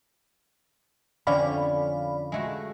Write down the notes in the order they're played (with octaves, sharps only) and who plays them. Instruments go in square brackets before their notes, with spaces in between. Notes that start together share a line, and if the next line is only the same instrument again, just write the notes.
[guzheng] F2 D3 C#4 [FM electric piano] D5 F5 B5
[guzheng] G#3 A3 F#4